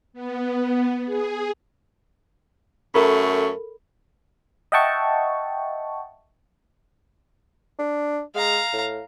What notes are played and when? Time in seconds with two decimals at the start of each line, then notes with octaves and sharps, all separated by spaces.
0.13 B3
1.06 G#4
2.94 F#2 A3 C#4 A4 A#4 B5
4.72 D#5 E5 F#5 G5 A5 C#6
7.79 D4
8.35 G#3 F5 A#5
8.73 A2